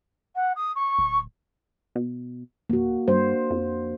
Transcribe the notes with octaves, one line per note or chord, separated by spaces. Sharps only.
F#5
D#6
C#6
D1
B2
D1 A#3 F#4
G2 A#3 D4 C5
F2